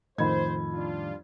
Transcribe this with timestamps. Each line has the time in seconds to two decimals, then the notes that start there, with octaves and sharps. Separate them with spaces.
0.18 F2 A2 D#3 C5 D#5 B5 G#6
0.73 G3 D4 F4